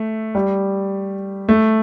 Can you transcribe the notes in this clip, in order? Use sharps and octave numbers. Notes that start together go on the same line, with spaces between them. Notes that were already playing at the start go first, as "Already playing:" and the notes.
Already playing: A3
G3
A3